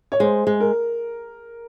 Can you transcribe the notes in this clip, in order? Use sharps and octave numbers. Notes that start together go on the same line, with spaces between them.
C#5
G#3 C5
G#3
A#4